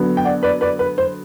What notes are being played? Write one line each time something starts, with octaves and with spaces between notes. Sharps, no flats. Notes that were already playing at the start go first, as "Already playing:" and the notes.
Already playing: D3 F#3 B3
G5
D5 F#5
B4 D5
B4 D5
B4
C5